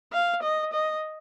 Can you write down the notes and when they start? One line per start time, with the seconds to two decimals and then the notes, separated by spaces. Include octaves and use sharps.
0.13 F5
0.42 D#5
0.73 D#5